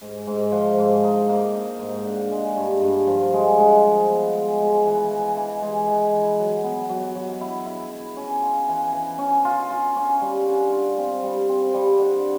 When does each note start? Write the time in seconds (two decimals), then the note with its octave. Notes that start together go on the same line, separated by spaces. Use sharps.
0.02 G#2
0.27 G#2
0.52 F3
0.78 G#2
1.04 D#4
1.29 A#3
1.55 D#4
1.79 G#2
2.05 D3
2.31 G#3
2.56 G2
2.82 G2
3.07 F3
3.33 G#3
3.58 G#3
3.84 F3
4.09 B3
4.35 G#3
4.60 G#3
4.86 E3
5.11 E3
5.37 E3
5.62 G#3
5.87 E3
6.13 E4
6.39 F#3
6.64 B3
6.89 F#3
7.15 F#3
7.41 E4
7.66 E4
7.91 E4
8.17 C#4
8.42 F4
8.68 E3
8.93 E3
9.18 C#4
9.45 F4
9.71 F4
9.96 C#4
10.21 G3
10.46 D3
10.73 F4
10.98 C4
11.23 G3
11.49 C4
11.74 G3
11.99 D3